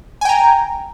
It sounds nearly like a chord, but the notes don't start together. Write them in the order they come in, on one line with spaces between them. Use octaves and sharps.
G#5 G5 A#5